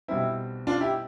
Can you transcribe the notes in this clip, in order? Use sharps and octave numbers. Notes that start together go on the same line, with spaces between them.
B1 B2 G3 C4 E4
D4 F4
E4 G4